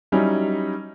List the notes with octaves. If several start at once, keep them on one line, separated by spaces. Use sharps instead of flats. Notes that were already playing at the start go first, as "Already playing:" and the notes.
F#3 G3 C#4 D#4 E4